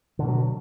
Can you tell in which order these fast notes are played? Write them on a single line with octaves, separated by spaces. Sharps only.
D3 B2 A3 F#3